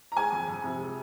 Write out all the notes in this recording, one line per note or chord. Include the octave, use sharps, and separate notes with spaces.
A#5
G#3 G#5
F2
F2
C3
G#3